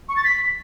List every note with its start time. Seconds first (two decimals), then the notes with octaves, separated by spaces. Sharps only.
0.09 C#6
0.16 A6
0.24 B6